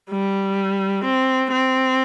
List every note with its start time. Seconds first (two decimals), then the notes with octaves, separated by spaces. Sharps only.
0.10 G3
1.05 C4
1.52 C4